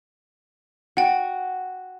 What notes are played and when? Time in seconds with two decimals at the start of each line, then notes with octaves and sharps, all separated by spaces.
0.97 F#4 F#5 G5